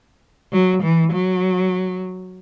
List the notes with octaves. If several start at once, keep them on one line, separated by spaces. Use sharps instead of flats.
F#3
E3
F#3